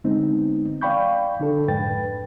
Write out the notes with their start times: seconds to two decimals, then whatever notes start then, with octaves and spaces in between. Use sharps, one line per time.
0.04 D3 G#3 B3 C4 D#4
0.81 D5 F5 G5 B5 C#6 G6
1.39 D3 D4 A4
1.68 F2 G#2 B4 G5 A6